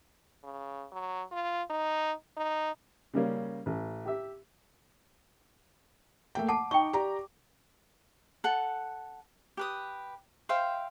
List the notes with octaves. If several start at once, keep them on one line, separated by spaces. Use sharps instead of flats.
C#3
F#3
F4
D#4
D#4
C#3 G3 A#3 C#4
A1
G4 E5
A3 A#3 G5
F#5 A5 D6
D#4 G5 C#6
G4 D5 A#5
A4 F#5
G4 B4 D#6
C5 E5 F5 G5